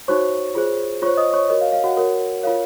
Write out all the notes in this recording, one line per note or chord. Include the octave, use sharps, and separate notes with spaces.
D#4 F#4 C5 C#5 C#6
F4 G#4 C5
F4 C5 C#5 C#6
D#5 D#6
C#5 C#6
F#4 A#4 C#5 D#5
F5
F5
F#4 F#5
F#4 A#4 C#5
F4 A#4 C#5 F5